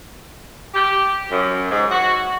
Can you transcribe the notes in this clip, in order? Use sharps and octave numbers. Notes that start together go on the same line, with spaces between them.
G4
F#2
G#2
F#4